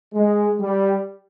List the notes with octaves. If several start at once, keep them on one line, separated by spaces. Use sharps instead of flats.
G#3
G3